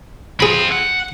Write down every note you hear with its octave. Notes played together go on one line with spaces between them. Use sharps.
C4 F4 G#4 B5
F#5